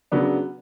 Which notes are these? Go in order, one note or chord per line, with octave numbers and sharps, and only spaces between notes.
C#3 F#3 B3 D4